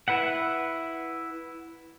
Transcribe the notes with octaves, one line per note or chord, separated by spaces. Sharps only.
E4 B4 E5 F#5